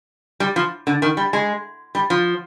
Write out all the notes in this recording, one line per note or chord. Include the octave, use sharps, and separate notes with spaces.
G3
F3
D3
D#3
G3
G#3
G3
F3